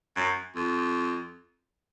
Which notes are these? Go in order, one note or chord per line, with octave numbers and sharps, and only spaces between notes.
F#2
F2